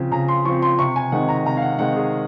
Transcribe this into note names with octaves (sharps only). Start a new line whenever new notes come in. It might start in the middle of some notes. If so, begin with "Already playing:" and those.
Already playing: C#3 F3 C4
C#3 A#5
C6
F3 C4 C#6
C6
C3 C#6
G#5
D#3 G#3 C4 F#5
A#5
C3 A#5
F5
F#5
D#3 G#3 C4 F#5
G#4